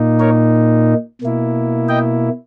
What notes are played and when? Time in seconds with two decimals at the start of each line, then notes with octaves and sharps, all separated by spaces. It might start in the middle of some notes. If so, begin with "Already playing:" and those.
Already playing: A#2 A#3 D#4
0.20 A#4 C#5
1.22 B2 A#3 E4
1.89 D#5 G5